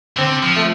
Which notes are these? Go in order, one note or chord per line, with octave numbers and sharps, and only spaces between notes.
D3 C4
F3
A3